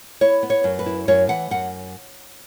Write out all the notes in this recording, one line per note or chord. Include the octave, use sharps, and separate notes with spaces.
E4 C#5
B3
C#5
F#2
B4
E4
F#2 C#5
E3 F#5
F#2 F#5